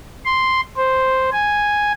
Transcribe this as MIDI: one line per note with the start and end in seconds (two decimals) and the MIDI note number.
0.25 0.60 84
0.76 1.30 72
1.32 1.92 80